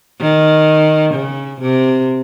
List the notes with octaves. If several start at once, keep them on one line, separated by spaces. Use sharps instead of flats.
D#3
C#3
C3